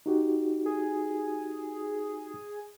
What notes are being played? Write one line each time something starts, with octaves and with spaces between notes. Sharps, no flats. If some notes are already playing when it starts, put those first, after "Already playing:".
D#4 F#4 G4
G#4